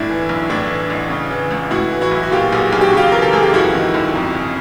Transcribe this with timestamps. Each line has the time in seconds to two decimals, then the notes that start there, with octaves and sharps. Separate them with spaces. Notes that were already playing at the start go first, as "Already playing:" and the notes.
Already playing: G1 A2 D4 E4
0.10 E3
0.29 B1
0.49 A2 D4 E4
0.70 E3
0.90 A1
1.10 C#3
1.31 E3
1.51 C#2
1.71 A2 E4 F#4
1.92 E3
2.01 E4 F#4
2.11 B1
2.23 F#4
2.31 A#2 F4 G4
2.52 B1 F#4 G#4
2.72 B1 G#4
2.81 G4
2.89 F#4
2.93 C#3 F4 G4
3.12 E3 A#4
3.22 A4
3.33 C#2 G#4
3.43 G4
3.53 F#2 E4 F#4
3.74 D#3
3.94 G1
4.15 F2
4.35 C#3